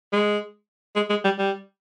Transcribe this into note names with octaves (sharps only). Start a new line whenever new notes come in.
G#3
G#3
G#3
G3
G3